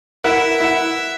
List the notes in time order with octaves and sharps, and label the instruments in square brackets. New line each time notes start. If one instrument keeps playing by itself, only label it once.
[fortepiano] E4 A#4 F#5 [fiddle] E5
[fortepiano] E4 F#5